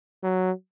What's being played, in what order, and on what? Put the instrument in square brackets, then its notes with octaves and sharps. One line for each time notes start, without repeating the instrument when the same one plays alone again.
[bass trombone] F#3